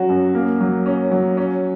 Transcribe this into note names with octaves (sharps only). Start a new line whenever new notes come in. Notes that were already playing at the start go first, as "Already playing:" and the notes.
Already playing: F#3 C#4 F#4
F#2
A#3
F#3
C#4
F#3
C#4